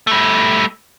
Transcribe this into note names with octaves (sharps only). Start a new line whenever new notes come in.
G3 A3